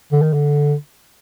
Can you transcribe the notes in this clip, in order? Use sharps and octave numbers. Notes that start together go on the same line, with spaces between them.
D3
D#3
D3